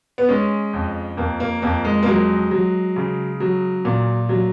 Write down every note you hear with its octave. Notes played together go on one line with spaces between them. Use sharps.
B3
G#3 C#4
F2
F2 A#3
A#3
F2 A#3
G#3
A#3
F#3 G#3
F#3
C#3
F#3
A#2
F#3